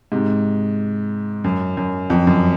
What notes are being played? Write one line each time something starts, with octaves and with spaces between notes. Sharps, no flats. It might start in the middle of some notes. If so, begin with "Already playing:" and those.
G#2 C3
F#2
F#2
F2
F#2